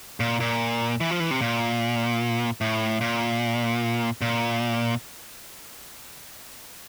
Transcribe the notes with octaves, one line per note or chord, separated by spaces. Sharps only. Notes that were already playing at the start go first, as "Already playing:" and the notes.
A#2
A#2
E3
F3
E3
C3
A#2
A2
A#2
A#2